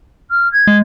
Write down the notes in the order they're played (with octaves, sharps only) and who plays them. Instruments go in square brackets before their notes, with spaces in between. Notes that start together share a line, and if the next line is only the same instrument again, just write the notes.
[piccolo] F6
G#6
[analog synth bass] G#3